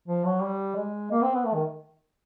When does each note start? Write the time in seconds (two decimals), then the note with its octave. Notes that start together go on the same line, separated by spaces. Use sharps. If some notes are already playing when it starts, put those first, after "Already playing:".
0.08 F3
0.25 F#3
0.42 G3
0.76 G#3
1.11 A#3
1.23 C4
1.34 B3
1.46 A3
1.54 D#3